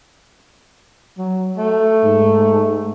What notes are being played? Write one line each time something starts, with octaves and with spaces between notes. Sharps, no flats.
F#3
A3
G#2